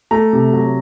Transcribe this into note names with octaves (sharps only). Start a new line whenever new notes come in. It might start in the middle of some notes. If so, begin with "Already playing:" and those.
A3 A#5
C3
F#3